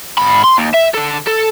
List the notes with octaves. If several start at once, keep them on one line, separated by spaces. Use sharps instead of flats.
G#2 B5
C6
D#2
E5
D3 A4
A4